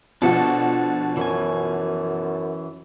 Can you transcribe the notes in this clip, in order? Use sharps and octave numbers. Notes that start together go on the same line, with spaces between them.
B2 F3 D4 F#4 A4
F#2 E3 C#4 G#5